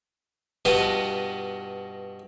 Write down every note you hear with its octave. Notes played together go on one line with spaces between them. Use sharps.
G2 B2 B3 F4 B4 D#5